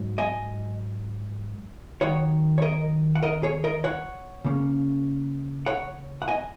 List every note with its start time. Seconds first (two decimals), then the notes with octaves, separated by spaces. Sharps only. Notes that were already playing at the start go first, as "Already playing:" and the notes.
Already playing: G#2 F#3 D#4
0.18 D#5 G#5
2.01 D#2 D#3 F#3 D#4 C#5 F#5
2.58 C#5
2.62 A#4 D#5
3.15 F#5
3.23 A#4 D#5
3.43 G#4 C#5
3.64 A#4 D#5
3.84 C#5 F#5
4.45 C#3 A#3 C#4
5.66 C#5 F#5
6.22 F#5
6.28 D#5 G#5